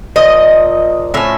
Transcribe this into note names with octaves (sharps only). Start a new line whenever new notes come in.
A#2 F3 D#5
A2 F3 C#4 E5